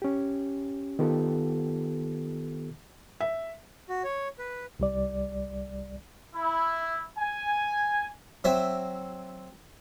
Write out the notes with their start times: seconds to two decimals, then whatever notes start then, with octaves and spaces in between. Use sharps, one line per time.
0.02 C#4 G4
0.99 D#3 B3 F4 G4 A4
3.21 E5
3.89 F#4
4.04 C#5
4.39 B4
4.79 C2 G3 D5
6.35 E4
7.17 G#5
8.44 F#3 C4 C5 E5